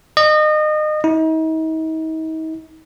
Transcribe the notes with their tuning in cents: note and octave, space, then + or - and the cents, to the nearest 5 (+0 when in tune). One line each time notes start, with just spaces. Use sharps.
D#5 -30
D#4 +40